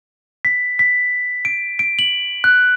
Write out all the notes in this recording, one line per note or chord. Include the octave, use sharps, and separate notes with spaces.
B6
B6
D7
D7
F#7
F#6